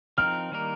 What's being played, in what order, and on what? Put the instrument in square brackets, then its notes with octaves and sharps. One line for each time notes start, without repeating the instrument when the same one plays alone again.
[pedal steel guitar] F3 C4 D#4 A#4 [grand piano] F6
[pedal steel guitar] D#3 G3 A#3 D#4 A#4